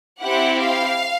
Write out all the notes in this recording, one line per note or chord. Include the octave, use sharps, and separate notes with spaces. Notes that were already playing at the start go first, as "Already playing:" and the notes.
C4 E4 G4 F#5
F5